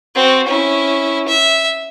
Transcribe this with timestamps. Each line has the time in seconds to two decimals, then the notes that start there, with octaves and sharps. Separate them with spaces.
0.15 C4 F#4
0.48 C#4 E4
1.28 E5